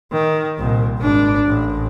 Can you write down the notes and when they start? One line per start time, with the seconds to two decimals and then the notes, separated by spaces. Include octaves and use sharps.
0.12 D#3
0.58 C2 A#2
0.99 G#1 D4
1.46 A1